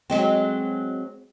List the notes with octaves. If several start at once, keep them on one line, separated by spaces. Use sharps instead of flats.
F#3 G#3 C4